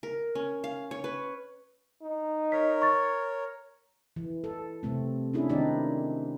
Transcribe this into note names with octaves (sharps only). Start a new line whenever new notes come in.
A#4
C#4
F5
C#5
B4
D#4
A#4 C#5 B6
C#6 A6
E3
A4
C3 A3 C4
C#4 D4 E4 G#4
D#3 C4 D4 D#4 G4 D5